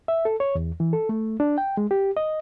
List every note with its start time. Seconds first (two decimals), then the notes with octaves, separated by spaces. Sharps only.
0.08 E5
0.25 A4
0.40 C#5
0.55 E2
0.80 E3
0.93 A4
1.09 A3
1.40 D4
1.58 G5
1.77 G#3
1.91 G4
2.17 D#5